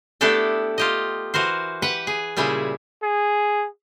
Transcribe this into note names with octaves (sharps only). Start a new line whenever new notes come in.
A3 B3 D4 E4 G4 A4
F4 G4 D#5
E3 F#4 A#4 C5
G4 B4 F#5
G#4
A#2 C#3 G3 E4 G#4
G#4